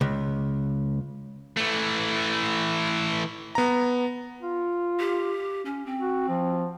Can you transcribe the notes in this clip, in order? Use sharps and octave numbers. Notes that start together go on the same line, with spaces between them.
C#2
E3 A3
B3 A#5
F4
G4
C#4
C4
F#4
F3